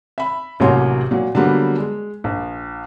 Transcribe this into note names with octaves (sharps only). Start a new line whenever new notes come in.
E5 B5
A1 C3 F#3 A#3 C#5 C6
A#2 F#3
D3 F#3 G3 A#3 B3
G#3
A#1